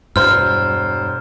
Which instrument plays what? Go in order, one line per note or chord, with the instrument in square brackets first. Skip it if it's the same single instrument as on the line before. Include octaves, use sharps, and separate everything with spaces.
[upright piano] E1 C5 [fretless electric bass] G2 [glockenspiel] F6